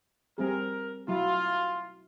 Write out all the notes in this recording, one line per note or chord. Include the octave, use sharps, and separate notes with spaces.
G3 C4 G#4 A#4
F#3 E4 F4